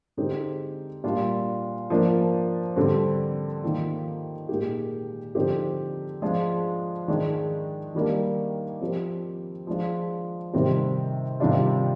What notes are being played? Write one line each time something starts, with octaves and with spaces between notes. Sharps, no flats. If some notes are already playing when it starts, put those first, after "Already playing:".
D3 G#3 C4 D#4 G4
A#2 G3 D4 F4
F3 A#3 D4
D3 G3 C4
D#3 A#3 F4
A#2 G#3 D#4 G4
D3 F3 C4 D#4 G4
F3 G#3 D4 F4
D#3 G#3 D4
D#3 G3 A#3 D4
F3 C4 G4
F3 G#3 D4 F4
C3 D#3 G3 C4
C3 D#3 G3 D4 F4